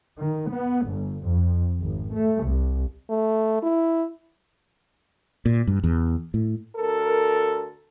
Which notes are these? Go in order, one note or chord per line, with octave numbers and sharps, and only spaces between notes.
D#3
B3
G1
F2
G#1
A3
C2
A3
E4
A#2
G2
E2
A2
D2 A4 A#4